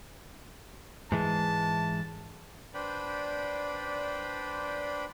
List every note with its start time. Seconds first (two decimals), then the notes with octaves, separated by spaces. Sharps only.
1.12 G#2 E3 G#3 A5
2.74 D4 B4 C5 D5 G5 B5